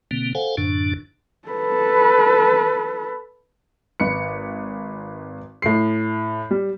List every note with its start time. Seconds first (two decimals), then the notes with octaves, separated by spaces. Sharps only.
0.11 B2 D3 A#3 C4
0.35 A4 C5 F5 F#5 G#5
0.57 F#2 A2 D3 D4
1.48 A4 B4
4.00 G#1 B4 C#7
5.62 A2 C7
6.51 G3